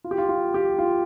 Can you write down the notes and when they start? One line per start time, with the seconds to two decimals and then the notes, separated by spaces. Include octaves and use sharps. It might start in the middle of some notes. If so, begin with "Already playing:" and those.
0.04 F4
0.11 G4
0.18 F4
0.29 F4
0.54 G4
0.79 F4